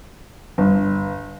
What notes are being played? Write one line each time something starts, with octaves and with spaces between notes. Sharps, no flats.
G1